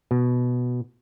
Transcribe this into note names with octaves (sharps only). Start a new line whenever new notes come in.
B2